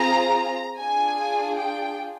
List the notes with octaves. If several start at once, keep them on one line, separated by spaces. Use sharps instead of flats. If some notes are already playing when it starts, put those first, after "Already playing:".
Already playing: C4 F4 G#4 A#5
D4 F4 G#4 G#5
G5